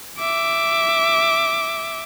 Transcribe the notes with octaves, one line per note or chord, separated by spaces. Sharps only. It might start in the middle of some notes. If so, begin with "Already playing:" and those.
E5 D6